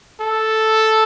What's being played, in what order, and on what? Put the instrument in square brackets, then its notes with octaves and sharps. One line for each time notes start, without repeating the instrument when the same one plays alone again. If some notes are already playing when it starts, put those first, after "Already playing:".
[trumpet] A4